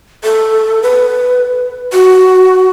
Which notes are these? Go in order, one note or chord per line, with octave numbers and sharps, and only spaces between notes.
A4
B4
F#4